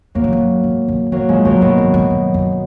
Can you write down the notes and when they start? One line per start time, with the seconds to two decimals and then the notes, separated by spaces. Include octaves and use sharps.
0.15 F#2 F#3 A#3
0.24 G#2
0.33 F#2
0.64 G#2
0.88 F#2
1.12 F#2 F#3 A#3
1.29 G#2 F3 G#3
1.45 F#2 D#3 F#3
1.61 G#2 B2 D#3
1.78 G#2
1.94 G#2
2.10 F#2
2.34 F#2